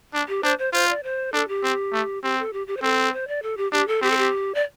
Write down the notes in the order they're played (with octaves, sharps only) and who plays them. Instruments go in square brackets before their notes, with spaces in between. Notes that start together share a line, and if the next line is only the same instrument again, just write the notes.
[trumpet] D4
[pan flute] G4
[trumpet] D4 [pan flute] C5
[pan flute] C5
[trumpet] F4 [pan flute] C5
[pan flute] D5
C5
[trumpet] D4 [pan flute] A4
[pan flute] G4
[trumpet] C4
A3
[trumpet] C4 [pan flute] G4
[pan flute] A4
G4
G4
C5
[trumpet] C4 [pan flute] A4
[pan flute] C5
D5
A4
G4
[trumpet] D4 [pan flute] G4
[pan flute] A4
[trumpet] C4 [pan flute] G4
[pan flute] A4
G4
D5